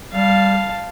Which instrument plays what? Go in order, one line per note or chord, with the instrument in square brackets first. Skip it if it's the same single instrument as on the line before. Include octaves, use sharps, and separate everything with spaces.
[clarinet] G3 [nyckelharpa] F5 A5